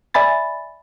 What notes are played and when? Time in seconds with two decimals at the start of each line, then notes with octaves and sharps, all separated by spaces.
0.14 D5 E5 G#5 B5 A6